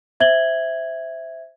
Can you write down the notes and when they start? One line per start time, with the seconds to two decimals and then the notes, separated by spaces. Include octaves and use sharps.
0.20 C5 E5 G#6 F#7 G7